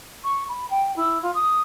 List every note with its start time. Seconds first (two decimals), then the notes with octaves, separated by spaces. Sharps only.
0.24 C#6
0.48 B5
0.70 G5
0.96 E4
1.22 F4
1.35 D#6